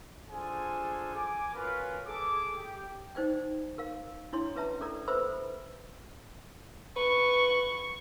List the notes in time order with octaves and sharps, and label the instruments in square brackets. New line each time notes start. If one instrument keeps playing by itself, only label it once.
[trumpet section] D4 F4 G#4 A4 C5 G#5
G#5 D6
C#4 F4 F#4 A#4 B4
G#4 A4 D6
G4
[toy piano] D#4 C5 D5 G5
A#4 F5
D4 E4 C#5 C6
C#4 B4 E5 A5 A#5
C#4 A4 A#4 D5 A#5
A4 B4 C5 E5 B5 E6
[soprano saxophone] B4 [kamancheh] C#6